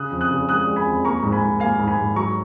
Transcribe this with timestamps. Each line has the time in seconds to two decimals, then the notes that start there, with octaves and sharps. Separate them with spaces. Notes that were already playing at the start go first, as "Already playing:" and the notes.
Already playing: C#3 D#6 F#6
0.11 F2
0.21 D#6 F#6
0.30 C#3
0.49 G#3 D#6 F#6
0.67 G#3
0.76 G#5 B5
0.85 F2
1.05 A#3 A#5 C#6
1.23 G#2
1.32 G#5 B5
1.41 G#2
1.60 A#3 F5 G#5
1.79 G#2
1.88 G#5 B5
1.98 G#2
2.16 F#3 A#5 C#6